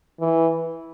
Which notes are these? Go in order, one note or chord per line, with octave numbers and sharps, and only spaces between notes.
E3